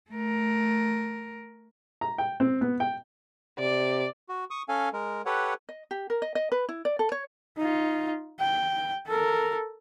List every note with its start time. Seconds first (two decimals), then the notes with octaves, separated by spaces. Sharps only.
0.11 A3 A#4
2.01 A#5
2.18 G5
2.40 C4
2.61 B3
2.80 G5
3.59 C3 D5
4.29 F#4
4.51 C#6 D#6
4.69 C#4 A4 F5 G#5
4.93 G#3 A#4
5.26 G4 A4 B4 C#5 F#5
5.69 D#5
5.91 G4
6.10 A#4
6.22 D#5
6.35 D#5
6.52 B4
6.69 E4
6.85 D5
6.99 A4
7.12 C#5
7.57 D#4 F4
8.39 G5
9.06 A4 A#4